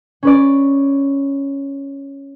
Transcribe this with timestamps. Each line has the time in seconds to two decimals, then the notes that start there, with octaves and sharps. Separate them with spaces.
0.23 C#4 B4 D5